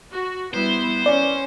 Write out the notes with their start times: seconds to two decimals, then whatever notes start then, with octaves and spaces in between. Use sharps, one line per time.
0.12 F#4
0.54 G3 B3 E4 C5
1.06 C#4 D5